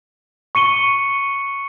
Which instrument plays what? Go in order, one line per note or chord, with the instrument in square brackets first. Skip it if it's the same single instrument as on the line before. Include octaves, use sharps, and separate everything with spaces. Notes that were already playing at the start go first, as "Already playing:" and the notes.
[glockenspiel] C#6 C#7 D#7 G7